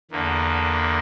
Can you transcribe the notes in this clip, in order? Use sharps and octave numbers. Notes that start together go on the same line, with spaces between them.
E2 D3 A#3